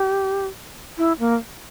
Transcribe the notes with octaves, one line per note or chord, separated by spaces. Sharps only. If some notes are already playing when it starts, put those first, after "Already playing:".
Already playing: G4
E4
A#3